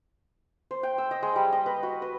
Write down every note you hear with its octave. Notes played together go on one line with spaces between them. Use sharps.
C5
G5
E6
D#5
G#3
G3
D#5
B4
F#4
B4